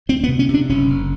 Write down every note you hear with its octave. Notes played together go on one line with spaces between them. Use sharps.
D2 C4
B3
C3
C#4
C3
D4
F#1 C#4
F#1